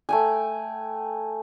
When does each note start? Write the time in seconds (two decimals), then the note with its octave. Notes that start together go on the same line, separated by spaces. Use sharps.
0.09 A3 G5 G#5